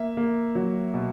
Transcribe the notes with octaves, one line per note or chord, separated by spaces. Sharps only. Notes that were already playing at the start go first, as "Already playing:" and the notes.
Already playing: A#3 E5
A#3
F#3
B2